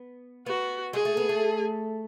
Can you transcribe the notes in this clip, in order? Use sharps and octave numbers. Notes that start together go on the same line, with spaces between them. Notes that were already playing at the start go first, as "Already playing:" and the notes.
Already playing: B3
B3 F#4
G#3 G#4
A3
B3
A3